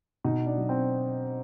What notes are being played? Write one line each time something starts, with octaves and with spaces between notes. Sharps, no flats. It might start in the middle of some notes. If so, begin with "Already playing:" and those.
B2 D#4
D4
F#3
C4